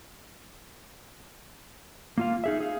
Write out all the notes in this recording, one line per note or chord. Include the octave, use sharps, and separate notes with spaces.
A#3 F4 F5
D#4 G#4 E5
G#4 F5